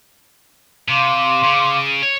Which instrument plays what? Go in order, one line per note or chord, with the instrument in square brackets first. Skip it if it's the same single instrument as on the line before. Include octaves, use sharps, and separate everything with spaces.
[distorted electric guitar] C3 [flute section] F5 C6 D6
[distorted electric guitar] C#3
C#5